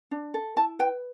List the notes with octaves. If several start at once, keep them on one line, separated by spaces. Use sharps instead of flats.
D4
A4
E4 A5
B4 G5